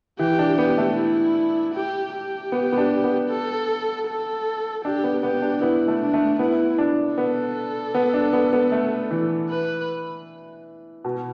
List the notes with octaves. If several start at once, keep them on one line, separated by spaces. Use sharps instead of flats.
E3 G4
D4
B3 G4
A3
E4
G4
G4
B3
B3
D4
B3
A4
A4
D4 G4
B3
B3 G4
D4
B3 E4
A3
D4
A3
B3 E4
D4
B3 A4
B3
D4
B3
B3
A3
E3
B4
B2